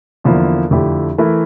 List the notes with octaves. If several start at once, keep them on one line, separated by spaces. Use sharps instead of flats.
E2 D3 F3 A#3 E4
F2 D3 A3 E4 G4
E3 A3 E4 A#4